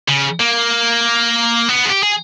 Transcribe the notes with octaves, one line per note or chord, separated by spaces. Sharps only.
C#3
A#3
B3
G#4
G4
G#4